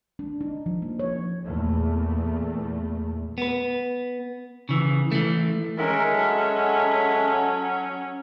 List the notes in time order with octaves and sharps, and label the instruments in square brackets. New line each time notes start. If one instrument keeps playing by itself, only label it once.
[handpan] D4
D#4
F3
A#3
C#5
[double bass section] E2 A#2 A3
[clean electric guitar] B3 B4
C#3 E3
E3 A3
[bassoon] D#3 [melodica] G#3 E5 [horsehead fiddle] C#4 [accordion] A#4
[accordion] F#3 [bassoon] A4